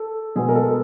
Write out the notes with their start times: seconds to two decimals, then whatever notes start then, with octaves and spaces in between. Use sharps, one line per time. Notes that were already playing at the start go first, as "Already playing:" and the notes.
Already playing: A4
0.36 B2 G#3 B3 G#4
0.49 A#4
0.55 A4